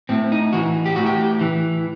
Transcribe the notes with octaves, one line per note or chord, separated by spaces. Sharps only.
A2 C4
D#4
E3 F#4
G4
A2 F#4
G4
E3